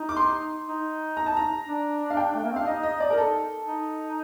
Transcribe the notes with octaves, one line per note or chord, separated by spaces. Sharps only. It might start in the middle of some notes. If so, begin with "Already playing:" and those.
Already playing: D#4
D6
C6
D#4
A#5
A5
A#5
D4
F5
G5
A3
A#3
C4
D4 F5
D#4 D#5
D#5
D5
A#4
A4
D#4